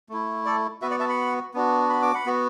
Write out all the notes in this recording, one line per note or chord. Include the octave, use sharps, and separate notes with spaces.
A3 E4
A4 D5
B3 F#4 B4 E5
D5 F#5
E5 A5
F#5 B5
B3 D4 F#4
B5
D6
F#5 B5
B3 F#4